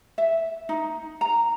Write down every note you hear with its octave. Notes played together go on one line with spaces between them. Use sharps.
E5
D#4
A#5